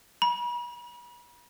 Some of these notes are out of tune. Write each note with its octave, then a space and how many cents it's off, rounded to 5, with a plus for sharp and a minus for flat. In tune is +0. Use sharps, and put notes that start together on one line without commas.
B5 -40